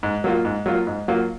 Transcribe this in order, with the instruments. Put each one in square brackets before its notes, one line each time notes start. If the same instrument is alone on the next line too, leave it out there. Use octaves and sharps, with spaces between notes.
[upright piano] G#2
F#3 A#3 F4
G#2
F#3 A#3 F4
G#2
F#3 A#3 F4